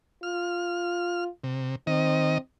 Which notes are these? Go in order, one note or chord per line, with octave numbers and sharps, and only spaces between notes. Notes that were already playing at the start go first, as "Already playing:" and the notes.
F4 F6
C3
D#3 C4 D#5